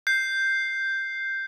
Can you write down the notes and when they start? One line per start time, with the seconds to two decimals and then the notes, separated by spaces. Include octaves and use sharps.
0.07 G6 C7